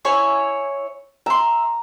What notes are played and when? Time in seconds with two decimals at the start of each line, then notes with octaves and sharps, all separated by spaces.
0.05 E4 C#5 G#5
1.26 E5 A#5 C6